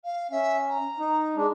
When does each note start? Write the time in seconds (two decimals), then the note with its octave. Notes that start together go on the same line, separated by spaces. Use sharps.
0.04 F5
0.31 C#4 E5
0.69 A#5
0.99 D#4
1.36 G#3 D4